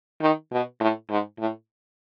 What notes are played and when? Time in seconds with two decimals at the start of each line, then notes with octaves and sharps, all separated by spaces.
0.22 D#3
0.52 B2
0.80 A2
1.10 G#2
1.39 A2